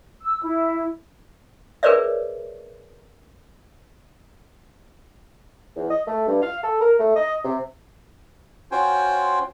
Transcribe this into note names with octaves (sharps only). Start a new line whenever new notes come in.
E6
E4
G#4 A#4 B4 C#5 D5 E5
E2
D#5
A3
G2
F5
A4
A#4
A3
D#5
C3
C#4 F4 F#4 C5 G5 G#5